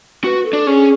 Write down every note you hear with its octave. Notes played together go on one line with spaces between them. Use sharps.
F#4 B4
A4
D4
C#4 G#4